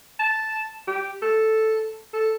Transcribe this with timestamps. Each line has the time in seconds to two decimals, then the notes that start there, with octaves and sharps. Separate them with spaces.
0.19 A5
0.87 G4
1.22 A4
2.13 A4